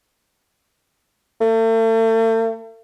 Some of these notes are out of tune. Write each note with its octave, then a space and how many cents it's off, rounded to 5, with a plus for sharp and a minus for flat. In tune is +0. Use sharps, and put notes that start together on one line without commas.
A3 +40